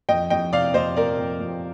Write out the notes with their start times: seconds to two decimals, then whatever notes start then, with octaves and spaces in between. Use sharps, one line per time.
0.09 F2 D#5 G5
0.30 F2 D#5 G5
0.53 C3 D5 F5
0.74 F2 C5 D#5
0.96 C3 A#4 D5
1.19 F2
1.40 F2